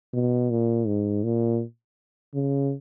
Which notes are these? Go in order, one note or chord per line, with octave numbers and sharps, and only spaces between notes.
B2
A#2
G#2
A#2
C#3